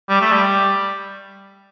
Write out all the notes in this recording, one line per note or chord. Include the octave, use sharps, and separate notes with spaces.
G3
A3
G3